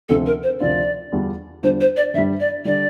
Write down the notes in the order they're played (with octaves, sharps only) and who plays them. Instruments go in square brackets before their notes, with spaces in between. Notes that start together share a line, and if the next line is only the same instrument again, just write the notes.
[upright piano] D2 C3 F3 C4 F4 [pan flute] A4
[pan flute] A#4
C5
[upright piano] D2 C3 F3 C4 F4 [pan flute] D5
[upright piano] E2 D3 G3 D4 F4
[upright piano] E2 D3 G3 D4 F4 [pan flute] C5
[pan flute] C5
D5
[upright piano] G2 D3 G3 [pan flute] E5
[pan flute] D5
[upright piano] D3 G3 [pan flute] D5